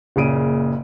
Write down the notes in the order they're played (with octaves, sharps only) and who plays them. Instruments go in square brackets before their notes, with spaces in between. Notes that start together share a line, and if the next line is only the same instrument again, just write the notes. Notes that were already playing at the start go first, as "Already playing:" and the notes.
[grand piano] F#1 A#2 C#3 D7 D#7